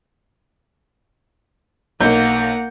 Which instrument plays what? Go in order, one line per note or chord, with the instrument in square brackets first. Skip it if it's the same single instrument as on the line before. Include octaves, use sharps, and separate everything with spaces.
[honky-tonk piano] B1 G6 [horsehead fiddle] A#3 [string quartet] A#4 F#5